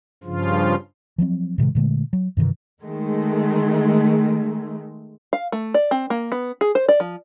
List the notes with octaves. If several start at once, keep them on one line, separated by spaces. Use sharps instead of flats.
G2 C#3 F3 F4
F3 F#3 A#3 C4
A2 C3 D#3 G#3
A#2 D3 G#3 A3
F#3
G2 C3 D#3 E3
D#3 G#3 A3
F5
A3
D5
C4
A#3
B3
G#4
C5
D5
F3